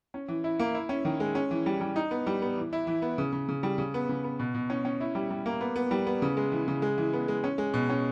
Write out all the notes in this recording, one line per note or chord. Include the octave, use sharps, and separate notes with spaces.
C#4
E3
E4
A#3
E4
C#4
D#3
G#3
C#4
E3
G3
G3
D#4
B3
G3
B3
E3
E4
E3
B3
C#3
C#3
C#3
G3
C#3
B3
C#3
B3
B2
B2
C#4
C#4
E4
G3
G3
A#3
B3
B3
G3
B3
C#3
G#3
E3
C#3
G#3
E3
B3
G#3
C#4
G#3
B2
C#4